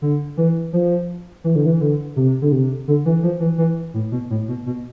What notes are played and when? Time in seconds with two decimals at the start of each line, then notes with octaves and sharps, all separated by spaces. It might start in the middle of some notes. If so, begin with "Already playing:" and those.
0.02 D3
0.37 E3
0.73 F3
1.44 E3
1.56 D3
1.66 E3
1.81 D3
2.16 C3
2.42 D3
2.52 C3
2.88 D3
3.06 E3
3.23 F3
3.40 E3
3.58 E3
3.94 A2
4.12 B2
4.30 A2
4.48 B2
4.66 B2